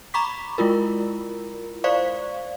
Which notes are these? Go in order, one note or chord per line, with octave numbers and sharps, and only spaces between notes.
A#5 B5 C#6 D6 B6
G#3 E4 F4 A#4
C5 D5 F5 C#6